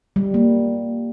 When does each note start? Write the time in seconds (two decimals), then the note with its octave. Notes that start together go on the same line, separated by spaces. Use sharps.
0.16 G3
0.34 A#3